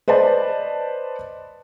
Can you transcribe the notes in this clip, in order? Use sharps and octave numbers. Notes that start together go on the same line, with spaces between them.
B4 C5 D5 D#5 A5